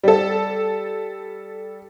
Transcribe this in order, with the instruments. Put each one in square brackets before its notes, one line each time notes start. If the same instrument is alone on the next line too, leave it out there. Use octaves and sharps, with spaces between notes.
[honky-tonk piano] G3 A4